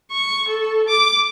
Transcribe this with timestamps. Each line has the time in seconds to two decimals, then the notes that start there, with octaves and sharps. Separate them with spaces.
0.12 C#6
0.48 A4
0.89 D6